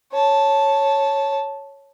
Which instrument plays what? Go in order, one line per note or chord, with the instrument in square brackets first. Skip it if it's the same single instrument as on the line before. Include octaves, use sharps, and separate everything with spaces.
[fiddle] C#5 A5